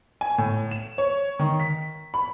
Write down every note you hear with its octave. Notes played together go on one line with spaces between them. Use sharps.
G#5
A2
E7
C#5
D#3
B6
B5